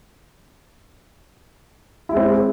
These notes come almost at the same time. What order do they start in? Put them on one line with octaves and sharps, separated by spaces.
E4 G#3 C4